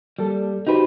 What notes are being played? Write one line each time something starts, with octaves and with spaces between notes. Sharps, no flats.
G3 A#3 A4
D#4 F#4 G4 B4 C5